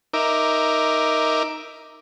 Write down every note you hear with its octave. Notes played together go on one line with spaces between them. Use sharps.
D#4 A#4 E5 D6